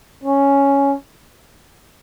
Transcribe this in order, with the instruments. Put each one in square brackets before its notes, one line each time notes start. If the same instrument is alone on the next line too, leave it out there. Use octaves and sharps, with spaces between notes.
[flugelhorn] C#4